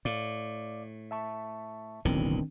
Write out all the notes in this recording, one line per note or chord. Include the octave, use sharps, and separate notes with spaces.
A2 D5 F5 D6
E5 A5 C#6
D1 B1 D#3 E3 C4 D4